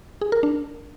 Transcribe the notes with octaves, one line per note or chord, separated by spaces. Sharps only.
G#4
A#4
D4